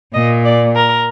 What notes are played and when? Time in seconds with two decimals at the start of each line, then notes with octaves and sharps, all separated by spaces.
0.14 A#2 D#5
0.45 D5
0.75 A#4